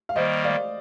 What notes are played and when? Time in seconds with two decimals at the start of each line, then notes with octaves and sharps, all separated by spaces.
0.09 F5
0.15 D#3 G3 A#3 C5 D#5
0.44 D5 F5